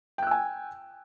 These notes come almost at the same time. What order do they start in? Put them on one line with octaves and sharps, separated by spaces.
G5 F#6 E6 G#5